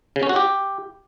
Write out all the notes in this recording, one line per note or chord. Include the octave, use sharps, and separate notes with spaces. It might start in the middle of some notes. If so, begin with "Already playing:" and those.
C#3
C#4
F#4
G4